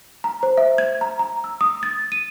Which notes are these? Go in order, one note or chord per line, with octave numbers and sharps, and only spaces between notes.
A#5
C5
E5
G#6
A#5
A#5
E6
D#6
A6
D#7